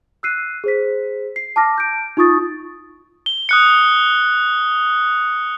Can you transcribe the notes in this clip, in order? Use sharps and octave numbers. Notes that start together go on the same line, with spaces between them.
E6 F#6 C7 D#7
G#4 C5 B6
C7
A5 D6 F6 A#6
G6 D7
D#4 F4 C#6 D#6 A6
G7
D#6 F#6 C#7